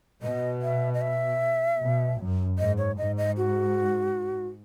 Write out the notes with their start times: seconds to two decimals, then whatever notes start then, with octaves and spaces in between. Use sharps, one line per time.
0.22 B2 D#5
0.62 E5
0.94 D#5
1.01 E5
1.80 B2
2.19 F#2
2.59 G#2 D#5
2.78 C#5
2.98 G#2 D#5
3.18 D#5
3.37 F#4